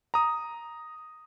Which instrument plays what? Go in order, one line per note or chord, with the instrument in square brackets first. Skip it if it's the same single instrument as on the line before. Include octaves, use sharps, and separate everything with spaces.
[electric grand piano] A#5 D#6